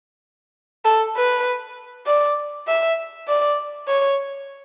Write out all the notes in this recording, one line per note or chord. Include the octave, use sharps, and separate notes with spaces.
A4
B4
D5
E5
D5
C#5